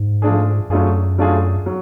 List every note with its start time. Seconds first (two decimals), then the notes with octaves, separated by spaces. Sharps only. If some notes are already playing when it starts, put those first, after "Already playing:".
Already playing: G#2
0.22 F3 A3 D4 G#4
0.70 F#2 F#3 A3 D4 F4 G#4
1.18 F#3 A3 D4 F4 G#4
1.66 F#3